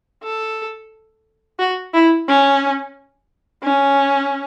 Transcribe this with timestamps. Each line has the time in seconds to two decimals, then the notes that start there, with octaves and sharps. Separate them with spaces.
0.23 A4
1.59 F#4
1.94 E4
2.28 C#4
3.64 C#4